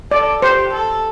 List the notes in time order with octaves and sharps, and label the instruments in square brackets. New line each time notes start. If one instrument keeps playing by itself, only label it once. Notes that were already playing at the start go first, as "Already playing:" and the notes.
[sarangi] A4 [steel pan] D5
[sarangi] G4 [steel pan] C5
[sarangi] A4